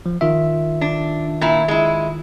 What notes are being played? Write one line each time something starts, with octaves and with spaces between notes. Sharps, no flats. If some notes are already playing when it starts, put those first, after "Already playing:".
F3
D#3 F4 E5
D4
A#2 E4
G#3 E4